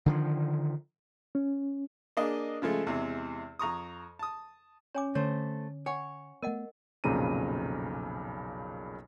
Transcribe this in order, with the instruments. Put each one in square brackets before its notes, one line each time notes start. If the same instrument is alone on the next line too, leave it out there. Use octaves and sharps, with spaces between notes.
[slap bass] D3 D#3 F3
[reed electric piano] C#4
[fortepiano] A#3 D4 G#4 D#5
C#3 F3 G#3 A3
E2 C3 G#3
F2 A#5 C#6 D#6
A5 D#6
[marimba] C#4 [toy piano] C#5 G#5 D6
[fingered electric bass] D3 [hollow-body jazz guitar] A3 C5 [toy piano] C#5
[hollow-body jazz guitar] C#5 [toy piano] F#5 G#5
[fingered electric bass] A3 B3 [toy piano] A#4 D#5 F#5
[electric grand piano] B1 F2 A#2 C#3 A#5 D#7